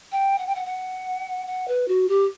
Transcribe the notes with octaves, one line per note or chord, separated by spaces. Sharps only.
G5
F#5
G5
F#5
F#5
F#5
B4
F#4
G4